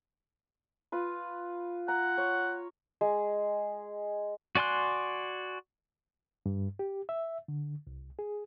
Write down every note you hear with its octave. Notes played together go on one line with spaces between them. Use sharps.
F4 B4
F#5 A#5
C#5
G#3
F#4 D5 G#5 C6 F#6
G2
G4
E5
D3
C2
G#4